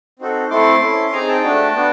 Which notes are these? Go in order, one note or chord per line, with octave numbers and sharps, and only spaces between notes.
C4 D#4 F#4 A4
A3 C4 E4 A4 C6 D6
C#4 E4 A4
C4 D#4 G#4 G#5 A#5
G5 A5
A3 D4 F#4
B3 D4 F#4